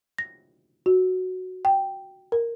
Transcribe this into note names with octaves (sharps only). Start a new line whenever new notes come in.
A#6
F#4
G5
A#4